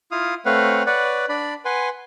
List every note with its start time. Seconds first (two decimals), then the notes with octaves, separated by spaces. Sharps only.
0.11 E4 F4 F5 D#6
0.45 A3 C4 B4 C#5 F5 F#5
0.86 B4 C#5 D5 F#5
1.29 D4 D5 B5
1.65 B4 F#5 G#5 C6